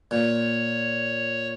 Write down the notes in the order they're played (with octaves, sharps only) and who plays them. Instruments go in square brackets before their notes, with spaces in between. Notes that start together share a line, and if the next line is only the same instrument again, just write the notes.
[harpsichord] A#2 [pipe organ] C#5